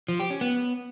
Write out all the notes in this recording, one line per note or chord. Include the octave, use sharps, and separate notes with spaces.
F3
G4
C#4
B3